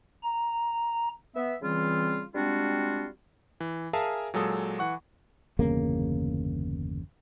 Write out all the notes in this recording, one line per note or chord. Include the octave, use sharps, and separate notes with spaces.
A#5
B3 E5
C#3 E3 G3 C4 F4
G3 G#3 C4 D4 F4 F#4
E3
G#4 A#4 E5 F5 G#5 A5
A#2 F#3 G#3 A4 D#6
E3 F#5 C#6
G1 E2 C#3 A#3